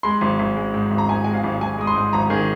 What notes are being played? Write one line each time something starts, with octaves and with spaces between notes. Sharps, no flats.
G#3 C6
G#1
G#1
G#3
G#2
G#1
A#5
G#1 G#5
G#3 G#5
F5
G#1
G#1 G#5
G#3 D#6
C6
G#2
G#1 A#5
D#3 G#4